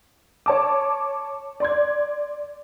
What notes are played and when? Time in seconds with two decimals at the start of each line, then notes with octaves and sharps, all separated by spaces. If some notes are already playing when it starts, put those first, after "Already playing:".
0.46 C#5 A5 D6
1.60 D5 C6 G#6